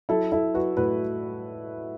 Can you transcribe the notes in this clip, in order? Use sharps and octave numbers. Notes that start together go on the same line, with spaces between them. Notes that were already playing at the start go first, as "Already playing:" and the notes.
F#3 E4 A4
F#3 E4 A4
F#3 F#4 B4
A2 F#4 B4